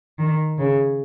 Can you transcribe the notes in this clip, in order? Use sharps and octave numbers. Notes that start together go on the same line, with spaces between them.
D#3
C#3